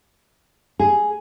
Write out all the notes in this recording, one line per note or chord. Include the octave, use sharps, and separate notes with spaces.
G#4